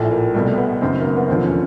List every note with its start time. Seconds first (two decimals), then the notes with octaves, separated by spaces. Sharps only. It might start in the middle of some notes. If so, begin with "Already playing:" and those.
Already playing: A#1 A2 F3 A3
0.11 A#3
0.34 C2 B2 G3 A3
0.58 B3
0.81 F#1 F#2 D#3 C4
1.01 A#3
1.04 B3
1.17 B3
1.28 E1 D#2 D3 F3 C4
1.44 C#4